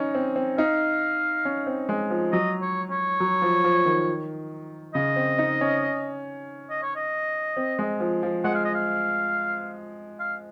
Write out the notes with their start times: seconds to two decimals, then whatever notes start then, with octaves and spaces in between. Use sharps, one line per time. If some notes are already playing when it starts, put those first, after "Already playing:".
Already playing: C#4 D#4
0.15 C4
0.36 C4
0.58 D#4 F5
1.45 C#4
1.67 C4
1.89 G#3
2.10 F3
2.32 F#3 D#5
2.62 C#5
2.91 C#5
3.20 F#3
3.42 F3
3.64 F3
3.86 D#3
4.94 C#3 D#5
5.16 C4
5.38 D#4
5.61 C#4
6.70 D#5
6.83 C#5
6.96 D#5
7.57 C4
7.79 G#3
8.00 F3
8.23 F3
8.44 G#3 F#5
8.55 F5
8.65 D#5
8.75 F5
10.20 F5